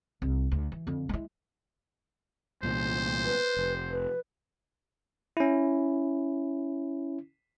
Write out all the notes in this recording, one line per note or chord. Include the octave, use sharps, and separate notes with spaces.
C2
D2
E3
F2 D3
G#3 E4
C2 A#2 E3 C5
B4
F1
B4
C#4 E4